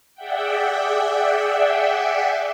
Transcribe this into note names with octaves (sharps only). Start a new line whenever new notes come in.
G#4 D5 E5 F#5 G5